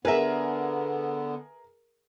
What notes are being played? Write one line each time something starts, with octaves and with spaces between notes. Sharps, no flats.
D3 B3 G#4 A#4 B4 E5